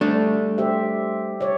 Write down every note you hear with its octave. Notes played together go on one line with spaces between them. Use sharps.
G3 A3 D4
G4 C5 E5
C#5 D5